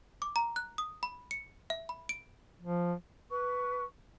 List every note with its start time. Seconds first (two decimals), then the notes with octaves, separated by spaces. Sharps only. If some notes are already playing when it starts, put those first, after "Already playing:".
0.22 D6
0.36 A#5
0.56 F#6
0.78 D#6
1.03 B5
1.31 C#7
1.70 E5
1.89 B5
2.09 D7
2.61 F3
3.30 B4 C#6